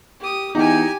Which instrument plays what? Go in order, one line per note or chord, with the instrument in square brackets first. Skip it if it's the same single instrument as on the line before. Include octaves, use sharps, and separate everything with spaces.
[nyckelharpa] G4 D#6
[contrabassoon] E2 [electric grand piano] D#4 [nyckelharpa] G4 G#5